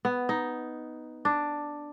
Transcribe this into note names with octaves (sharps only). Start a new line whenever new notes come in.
B3
D#4
D4